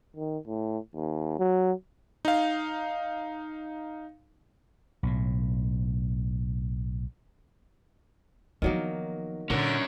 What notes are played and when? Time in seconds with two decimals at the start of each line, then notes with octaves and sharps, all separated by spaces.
0.16 D#3
0.47 A2
0.95 D#2
1.39 F#3
2.25 D#4 F5
5.03 B1 A2
8.62 D#3 F3 F#3 A#3 B3
9.50 A#2 D3 C#4 A#4